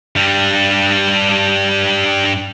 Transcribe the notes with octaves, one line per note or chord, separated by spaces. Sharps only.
G2 G3